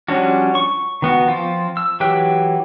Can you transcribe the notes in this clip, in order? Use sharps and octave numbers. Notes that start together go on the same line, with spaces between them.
F3 G3 C#4 D4 F#4
C#6
D#3 B3 F#4
F3 C4 F4
E6
E3 F#3 G4 G5 F#6